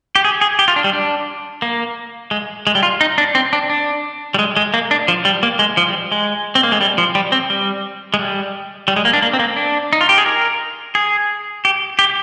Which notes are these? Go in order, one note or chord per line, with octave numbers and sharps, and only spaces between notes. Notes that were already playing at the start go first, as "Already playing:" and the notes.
G4
G#4
G#4
G4
F4
D4
G3
D4
A#3
G#3
G#3
G3
F4
D#4
D4
C4
D4
D4
G3
G#3
G#3
A#3
D4
F3
G3
A#3
G#3
F3
G3
G#3
C4
A#3
G#3
G3
F3
G3
C4
G3
G#3
G3
G3
G#3
A#3
D4
A#3
C4
A#3
D4
D#4
F4
G4
G#4
A#4
G#4
G4
G4